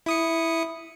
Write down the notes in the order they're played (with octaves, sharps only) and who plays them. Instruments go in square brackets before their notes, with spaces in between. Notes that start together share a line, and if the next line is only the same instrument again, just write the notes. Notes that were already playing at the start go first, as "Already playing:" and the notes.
[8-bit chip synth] E4 D#6 C#7